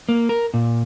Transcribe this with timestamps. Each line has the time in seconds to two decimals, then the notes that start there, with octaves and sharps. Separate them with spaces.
0.09 A#3
0.29 A#4
0.54 A#2